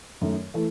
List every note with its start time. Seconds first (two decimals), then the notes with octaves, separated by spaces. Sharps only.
0.21 F#2 D#3 A3
0.54 E3 A3